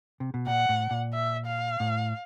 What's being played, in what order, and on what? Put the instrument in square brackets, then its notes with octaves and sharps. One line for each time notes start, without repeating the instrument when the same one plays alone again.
[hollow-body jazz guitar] C3
B2
[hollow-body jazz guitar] A#2 [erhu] F#5
[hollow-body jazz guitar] A2
A#2
[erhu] E5
F5
[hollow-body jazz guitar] A2